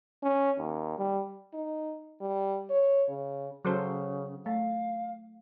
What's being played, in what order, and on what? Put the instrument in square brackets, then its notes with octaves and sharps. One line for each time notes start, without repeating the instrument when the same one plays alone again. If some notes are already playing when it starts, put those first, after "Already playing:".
[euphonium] C#4
D#2
G3
[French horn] D#4
G3
C#5
C#3
[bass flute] C#3 [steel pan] F#3 A4 C5
[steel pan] A3 [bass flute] F5